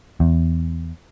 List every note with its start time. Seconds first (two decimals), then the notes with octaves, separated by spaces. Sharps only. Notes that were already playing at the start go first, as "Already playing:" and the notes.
0.20 E2